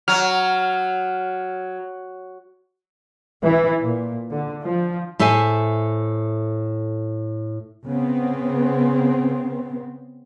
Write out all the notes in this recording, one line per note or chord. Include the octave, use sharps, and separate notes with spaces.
F#3 F6
E3
A#2
D3
F3
A2 A4 C5 E5 G#5
C#3 B3 C4